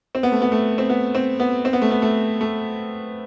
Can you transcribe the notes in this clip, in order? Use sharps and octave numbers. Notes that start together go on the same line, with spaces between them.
C4
B3
A3
B3
A3
C4
B3
C4
B3
C4
B3
A3
B3
A3
A3